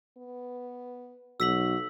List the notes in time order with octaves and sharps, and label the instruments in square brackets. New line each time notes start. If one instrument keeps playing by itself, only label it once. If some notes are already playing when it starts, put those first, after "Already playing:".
[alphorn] B3
[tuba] B1 [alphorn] F#4 [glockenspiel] E6 B6 F#7